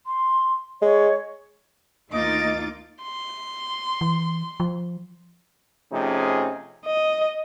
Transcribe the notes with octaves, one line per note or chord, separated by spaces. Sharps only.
C6
G#3 C#5
D2 D#3 A#3 D#4 F4 D#5 D6 A6
C6
E3
F3
C3 F3 A3 C#4 D#4 G#4
D#5